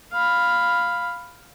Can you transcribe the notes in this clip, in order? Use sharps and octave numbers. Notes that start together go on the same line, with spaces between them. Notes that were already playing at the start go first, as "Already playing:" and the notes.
F5 B5